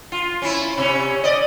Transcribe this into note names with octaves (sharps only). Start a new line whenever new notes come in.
F4
C#4 E4
C3 C#4
D5 D#5